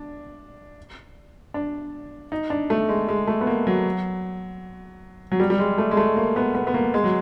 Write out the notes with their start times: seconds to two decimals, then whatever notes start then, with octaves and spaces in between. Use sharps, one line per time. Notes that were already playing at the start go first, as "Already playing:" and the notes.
Already playing: D4
1.54 D4
2.32 D#4
2.50 D4
2.70 A3
2.89 G#3
3.08 G#3
3.27 A3
3.41 B3
3.47 A#3
3.67 F#3
5.32 F#3
5.40 G3
5.50 G3
5.59 G#3
5.78 A3
5.91 G#3
5.97 A3
6.16 A#3
6.36 B3
6.55 B3
6.67 B3
6.74 A#3
6.94 G#3
7.04 F#3